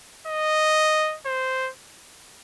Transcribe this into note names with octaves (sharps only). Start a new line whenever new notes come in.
D#5
C5